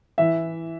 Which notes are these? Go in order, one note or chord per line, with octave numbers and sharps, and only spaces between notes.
E3 E5